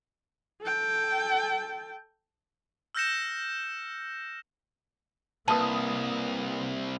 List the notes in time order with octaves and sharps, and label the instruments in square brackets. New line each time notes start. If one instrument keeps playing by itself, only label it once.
[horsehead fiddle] A4 G5
[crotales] E6 F6 G6 A#6 C#7 E7
[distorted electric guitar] C2 [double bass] A#3 [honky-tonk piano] B4 D#6 [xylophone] A5